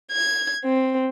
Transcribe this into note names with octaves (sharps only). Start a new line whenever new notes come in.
G#6
C4